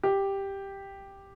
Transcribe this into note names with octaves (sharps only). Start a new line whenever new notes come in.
G4